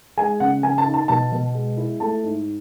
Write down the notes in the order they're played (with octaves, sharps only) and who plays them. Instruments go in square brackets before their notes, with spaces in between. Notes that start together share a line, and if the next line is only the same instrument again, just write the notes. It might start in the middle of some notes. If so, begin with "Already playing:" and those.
[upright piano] G#3 G#5
C#3 F#5
C#3 G#5
A5
D#4
A5
B2 A5
B2
G#3
E4
A3 A5
G#2